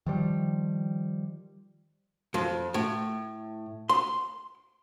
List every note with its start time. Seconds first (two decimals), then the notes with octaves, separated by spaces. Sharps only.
0.06 D#3 F3 G3
2.34 F2
2.74 A2
3.89 C6